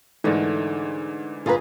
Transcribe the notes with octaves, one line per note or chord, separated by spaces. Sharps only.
G#2 D3 E3 A3 D#4 A#4
G1 F4 G#4 A4 B4 A#5